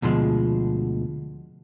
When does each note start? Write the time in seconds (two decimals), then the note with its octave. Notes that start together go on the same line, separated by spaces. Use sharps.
0.02 D2 B2 F3 G#3